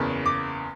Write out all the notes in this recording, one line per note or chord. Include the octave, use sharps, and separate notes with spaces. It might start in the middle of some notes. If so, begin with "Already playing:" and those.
Already playing: F#1 E2 C#3
D6